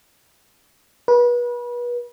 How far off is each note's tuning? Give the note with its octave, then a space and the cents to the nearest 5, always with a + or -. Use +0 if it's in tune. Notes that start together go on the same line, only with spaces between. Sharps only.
B4 -35